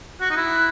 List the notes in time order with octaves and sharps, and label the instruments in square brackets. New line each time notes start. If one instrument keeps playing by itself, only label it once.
[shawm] F#4 [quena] F#6
[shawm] D#4
E4